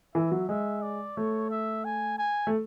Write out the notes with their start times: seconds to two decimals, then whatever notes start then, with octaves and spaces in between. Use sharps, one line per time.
0.15 E3 E5
0.32 F#3
0.49 G#3 E5
0.82 D5
1.17 A3 C#5
1.51 E5
1.85 G#5
2.18 G#5
2.47 A3